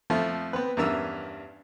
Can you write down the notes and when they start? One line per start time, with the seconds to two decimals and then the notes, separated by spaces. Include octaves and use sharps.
0.10 F2 F3 A3
0.53 B3 C4 B4
0.77 E2 G2 C#4 A#4 E5 E6